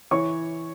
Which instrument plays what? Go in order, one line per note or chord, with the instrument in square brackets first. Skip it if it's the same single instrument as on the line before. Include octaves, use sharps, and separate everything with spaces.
[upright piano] E3 C#5 C#6